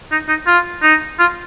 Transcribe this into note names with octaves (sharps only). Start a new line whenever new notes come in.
D#4
D#4
F4
D#4
F4